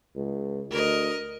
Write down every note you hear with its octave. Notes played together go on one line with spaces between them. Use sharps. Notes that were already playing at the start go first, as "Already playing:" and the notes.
C#2
D2 A#4 D#5